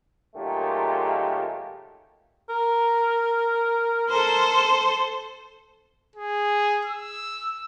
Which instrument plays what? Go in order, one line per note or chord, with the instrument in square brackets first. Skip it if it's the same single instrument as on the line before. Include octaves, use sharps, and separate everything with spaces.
[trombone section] A#2 D#3 F#3 G#3 A3 G4
[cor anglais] A#4
[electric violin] A4 C5
[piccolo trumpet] G#4
E6